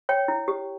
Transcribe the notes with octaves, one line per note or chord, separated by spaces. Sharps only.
C#5 G5
E4
G4